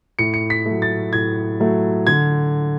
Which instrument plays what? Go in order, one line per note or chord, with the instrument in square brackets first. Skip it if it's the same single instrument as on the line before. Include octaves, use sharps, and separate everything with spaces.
[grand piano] A2 C#7
C#7
B6
A3
F#3
A6
A2 G#6
F#3 A3
D3 G#6